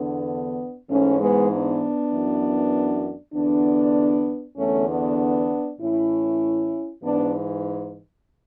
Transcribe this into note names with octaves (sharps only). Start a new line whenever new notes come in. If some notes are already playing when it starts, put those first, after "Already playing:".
Already playing: E2 D3 B3 D4
G#2 E3 A3 C#4
G#3 B3
B3 D4
F#2 E3
E2 D3 B3 D4
E2 D3 A3 C#4
B3 D4
A2 E3 C#4 E4
G#2 E3 B3 D4